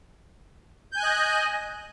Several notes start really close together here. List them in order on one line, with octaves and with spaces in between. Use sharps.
G6 G#5 F#6 D#5